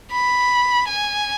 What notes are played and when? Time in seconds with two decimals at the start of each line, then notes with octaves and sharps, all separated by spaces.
0.11 B5
0.88 G#5